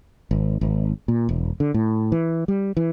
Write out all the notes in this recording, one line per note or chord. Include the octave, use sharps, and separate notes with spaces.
G#1
G#1
A#2
E1
D3
A2
E3
G3
E3